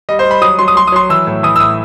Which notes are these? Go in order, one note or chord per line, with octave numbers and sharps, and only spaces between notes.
G3 D#5
C5
G3
B5
F#3 D#6
F#3 C6
D#6
F#3 C6
D#6
F#3 C6
E3 E6
A2
E3 D#6
E6
A2 D#6